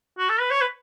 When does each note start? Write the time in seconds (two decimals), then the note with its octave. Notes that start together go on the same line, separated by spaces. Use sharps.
0.18 F#4
0.29 A4
0.40 B4
0.51 C#5
0.61 B4